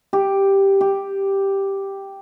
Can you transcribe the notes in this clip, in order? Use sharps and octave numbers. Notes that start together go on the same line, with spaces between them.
G4
G4